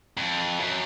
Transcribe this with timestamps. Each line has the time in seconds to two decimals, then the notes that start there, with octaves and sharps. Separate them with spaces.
0.17 F2
0.60 F#2